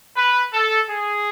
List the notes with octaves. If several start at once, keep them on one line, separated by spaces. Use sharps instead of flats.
B4
A4
G#4